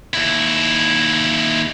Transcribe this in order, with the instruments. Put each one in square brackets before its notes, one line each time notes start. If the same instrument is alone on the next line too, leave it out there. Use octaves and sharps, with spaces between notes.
[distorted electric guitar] D#2 E4